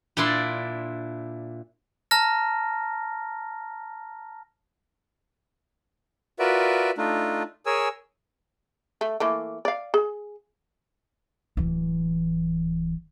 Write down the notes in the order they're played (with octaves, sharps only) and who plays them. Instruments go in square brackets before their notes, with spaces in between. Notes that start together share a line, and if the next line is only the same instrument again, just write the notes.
[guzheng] A#2 D4 E4 D5 C6
[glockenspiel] A5 A#5 F6 A#6
[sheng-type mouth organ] F4 F#4 A#4 B4 D5 E5
A3 D4 D#4 F4
G#4 A#4 C#5 G#5 E6
[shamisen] A3
E3 A3 A#3
D5 F5
G#4
[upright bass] D1 E3